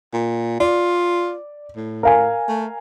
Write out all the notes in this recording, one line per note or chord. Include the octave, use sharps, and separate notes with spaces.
A#2
F4 D5
A2
A#4 F5 G#5
A3